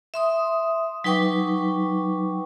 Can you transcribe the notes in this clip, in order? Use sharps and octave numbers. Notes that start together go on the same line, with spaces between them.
E5 C6 D#6
F#3 D#4 B4 G5 C#6 D6